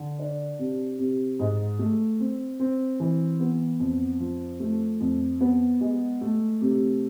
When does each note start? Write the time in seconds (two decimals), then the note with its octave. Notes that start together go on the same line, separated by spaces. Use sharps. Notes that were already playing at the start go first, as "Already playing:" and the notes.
Already playing: D3
0.19 D4
0.59 C3
0.99 C3
1.39 G#2
1.79 A3
2.20 C4
2.60 C4
3.00 E3
3.40 B3
3.80 F2
4.20 F3
4.60 A3
5.00 F2
5.41 B3
5.81 G#3
6.21 A3
6.61 C3